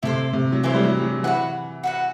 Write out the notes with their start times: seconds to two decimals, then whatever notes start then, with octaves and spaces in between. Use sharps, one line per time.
0.03 C3 E4 A4 C5
0.33 C3
0.52 F#3
0.63 E3 E4 A4 C5
0.74 G3
0.83 F#3
1.03 F#3
1.23 E3 F#4 B4 F#5
1.84 F#4 B4 F#5